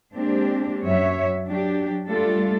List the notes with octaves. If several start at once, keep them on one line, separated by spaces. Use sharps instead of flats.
G#3 A#3 C4 D4 G4
F#2 F#4 C#5 E5
F#3 D4 G4
G3 A3 D4 F4 A4